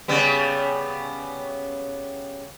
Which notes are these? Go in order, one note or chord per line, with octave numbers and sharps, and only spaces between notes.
C#3 G3 B3